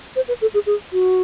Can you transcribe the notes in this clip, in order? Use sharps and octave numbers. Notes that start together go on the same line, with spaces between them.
C5
B4
A4
G#4
G#4
F#4